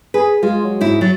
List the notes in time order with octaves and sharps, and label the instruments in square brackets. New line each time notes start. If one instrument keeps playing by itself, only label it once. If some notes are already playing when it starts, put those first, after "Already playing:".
[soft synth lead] G#4 [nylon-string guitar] B4
[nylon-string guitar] G#3 [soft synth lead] F4
[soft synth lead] F#3
[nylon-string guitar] G#2 E4
[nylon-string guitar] F#3 [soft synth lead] A6